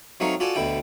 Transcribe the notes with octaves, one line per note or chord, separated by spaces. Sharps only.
F#3 A3 C4 D#4 C#5 F5
F4 F#4 A4 D5 G#5 A5
D2 B2 D3 E4 G5